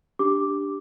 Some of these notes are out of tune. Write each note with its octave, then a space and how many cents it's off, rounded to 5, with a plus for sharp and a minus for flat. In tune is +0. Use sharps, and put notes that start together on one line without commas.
D4 +0 G4 +5 D6 +0